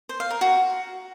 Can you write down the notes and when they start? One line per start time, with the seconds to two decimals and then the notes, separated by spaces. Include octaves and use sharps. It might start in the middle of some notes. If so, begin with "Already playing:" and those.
0.09 C5
0.20 F5
0.31 A#4
0.41 F#4